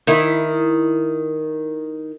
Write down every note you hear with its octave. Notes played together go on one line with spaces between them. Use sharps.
D#3 E4